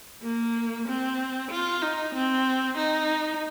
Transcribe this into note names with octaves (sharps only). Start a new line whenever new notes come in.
A#3
C4
F4
D#4
C4
D#4